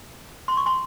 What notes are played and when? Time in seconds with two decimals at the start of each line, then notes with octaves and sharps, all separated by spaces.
0.48 C6
0.57 C#6
0.66 G#5 C6